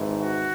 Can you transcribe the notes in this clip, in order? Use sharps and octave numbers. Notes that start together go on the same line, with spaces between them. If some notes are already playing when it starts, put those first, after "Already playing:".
Already playing: G#1 G#2 E3
F#4